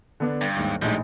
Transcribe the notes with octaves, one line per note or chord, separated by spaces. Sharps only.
D3 B3 D4
G2
D#2 G#2
A#1 A2 G3 G#3 D#4